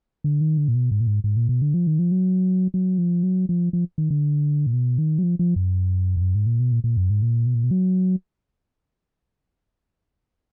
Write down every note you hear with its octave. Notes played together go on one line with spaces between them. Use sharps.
D3
D#3
D3
A#2
B2
G#2
A#2
G#2
G#2
A#2
B2
D3
F3
D#3
F3
F#3
F#3
F3
F#3
F3
F3
D#3
D3
A#2
B2
D#3
F#3
F3
F3
F#2
F2
F#2
G#2
A#2
B2
A#2
A#2
F#2
G#2
A#2
B2
A#2
B2
F#3